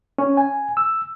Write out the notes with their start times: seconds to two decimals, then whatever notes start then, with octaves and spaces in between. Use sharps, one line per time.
0.18 C#4
0.37 G#5
0.77 E6